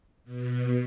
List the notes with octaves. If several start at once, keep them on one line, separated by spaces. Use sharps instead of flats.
B2